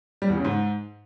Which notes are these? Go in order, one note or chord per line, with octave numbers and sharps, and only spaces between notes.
G3
E2
C#3
G#2